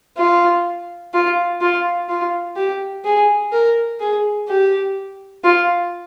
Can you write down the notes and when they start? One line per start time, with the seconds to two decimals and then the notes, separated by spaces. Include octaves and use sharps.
0.17 F4
1.14 F4
1.61 F4
2.09 F4
2.56 G4
3.05 G#4
3.52 A#4
4.00 G#4
4.48 G4
5.44 F4